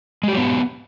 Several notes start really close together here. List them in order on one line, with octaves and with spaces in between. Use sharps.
G#3 G4 F#3 B3